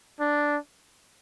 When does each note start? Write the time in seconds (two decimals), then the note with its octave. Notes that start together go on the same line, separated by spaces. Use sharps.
0.20 D4